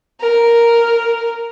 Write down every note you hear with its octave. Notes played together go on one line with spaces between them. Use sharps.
A#4